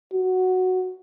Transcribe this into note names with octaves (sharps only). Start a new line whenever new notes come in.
F#4